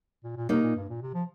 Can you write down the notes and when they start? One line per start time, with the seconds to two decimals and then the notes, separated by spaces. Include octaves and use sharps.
0.24 A#2
0.36 A#2
0.49 C3 A#3 D#4
0.62 A#2
0.75 G2
0.89 A#2
1.02 C3
1.14 F3